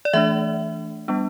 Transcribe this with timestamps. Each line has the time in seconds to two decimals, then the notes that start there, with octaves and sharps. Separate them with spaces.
0.05 D5
0.13 E3 A3 D4 E5
1.08 G3 B3 D4